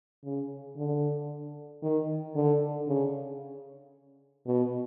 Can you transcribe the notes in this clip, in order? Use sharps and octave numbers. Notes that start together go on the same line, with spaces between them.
C#3
D3
D#3
D3
C#3
B2